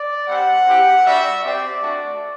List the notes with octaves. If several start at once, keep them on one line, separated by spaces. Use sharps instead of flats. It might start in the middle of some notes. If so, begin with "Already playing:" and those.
Already playing: D5
G3 C4 G4 F#5
C4 E4 G4
G3 D4 F#4 E5
C4 G4 D5
A3 D4 F#4